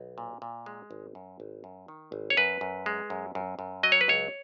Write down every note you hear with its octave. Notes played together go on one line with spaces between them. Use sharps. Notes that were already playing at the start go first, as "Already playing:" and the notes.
Already playing: B1
A#2
A#2
G#3
G#1
F#2
G#1
F#2
D#3
G#1
C#5
F#2 B4
F#2
G#3
F#2
F#2
F#2
F#3 D#5
C#5
B4
C#2 C#5